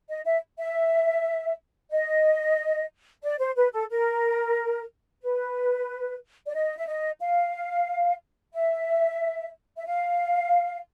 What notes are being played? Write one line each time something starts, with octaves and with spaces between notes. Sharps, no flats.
D#5
E5
E5
D#5
D5
C5
B4
A4
A#4
B4
D5
D#5
E5
D#5
F5
E5
E5
F5